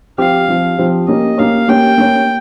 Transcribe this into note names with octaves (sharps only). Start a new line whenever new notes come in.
F3 C4 G4 F5
F3 C4 G4
F3 C4 G4
A#3 C#4 G4 C#5 D#5
A#3 C#4 G4 C#5 F5
A#3 C#4 G4 C#5 G5
A#3 C#4 G4 C#5